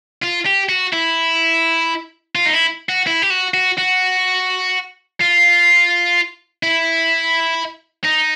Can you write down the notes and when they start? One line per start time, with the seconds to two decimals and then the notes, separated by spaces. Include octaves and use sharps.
0.22 F4
0.46 G4
0.69 F#4
0.93 E4
2.35 F4
2.45 D#4
2.53 E4
2.89 F#4
3.07 E4
3.22 G4
3.30 F#4
3.54 F#4
3.78 F#4
5.20 F4
6.63 E4
8.05 D#4